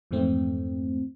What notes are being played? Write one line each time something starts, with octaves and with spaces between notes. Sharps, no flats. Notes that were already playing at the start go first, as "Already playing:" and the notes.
F2 G#2 E3 A3 C4